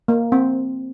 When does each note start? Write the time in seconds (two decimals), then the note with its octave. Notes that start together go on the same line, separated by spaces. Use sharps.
0.08 A#3
0.32 C4